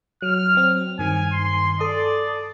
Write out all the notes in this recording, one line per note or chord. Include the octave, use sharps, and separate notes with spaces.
F#3 F6
F#3 C4
G2 D#3 G#5
C6
A4 D5 A5 D#6